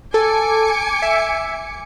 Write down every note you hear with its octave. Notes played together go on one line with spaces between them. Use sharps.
A4 G#5 D6 C#7
E5